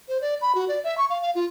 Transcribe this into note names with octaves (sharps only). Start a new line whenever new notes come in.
C5
D5
B5
F#4
D5
E5
C#6
F5
F5
F4